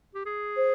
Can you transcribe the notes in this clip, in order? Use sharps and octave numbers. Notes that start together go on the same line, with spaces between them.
G4
G#4
C5